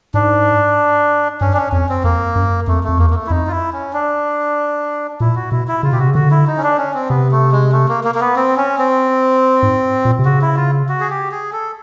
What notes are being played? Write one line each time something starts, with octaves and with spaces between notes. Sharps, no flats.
G#2 D4
G2 C#4
D4
C#4
F2 C#4
C4
F2 A#3
F#2
F2 A3
F2 A3
E2 A#3
A#3
A3
E4
F2 D#4
F4
E4
C#4
D4
A#2 E4
F#4
B2 E4
E4
C#3 F4
B2 G4
C3 F#4
C#3
D3 F#4
E4
D#4
C#4
D4
C#4
C4
C3 B3
A3
G#3
A3
A#3
A#3
A#3
B3
C4
C#4
C4
G#2
A#2
C3
C#3 F#4
E4
F4
F#4
G#4
G4
G#4
A4